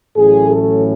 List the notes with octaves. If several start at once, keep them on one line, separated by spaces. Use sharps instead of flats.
A1 A2 F#3 C#4 G#4
A4